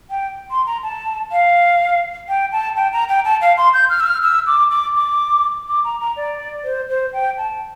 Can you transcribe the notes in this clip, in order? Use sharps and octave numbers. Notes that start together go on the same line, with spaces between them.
G5
C6
A#5
A5
F5
G5
A5
G5
A#5
G5
A5
F5
C6
G6
F6
E6
F6
E6
D6
D6
D6
D6
A#5
A#5
D5
C5
C5
G5
A5